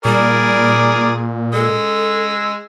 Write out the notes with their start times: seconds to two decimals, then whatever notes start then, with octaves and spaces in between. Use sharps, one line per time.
0.05 A#2 G3 G#4 A#4 D5
1.53 G#3 A4 E6